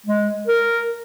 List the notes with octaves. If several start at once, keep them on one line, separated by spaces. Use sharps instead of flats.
G#3
A#4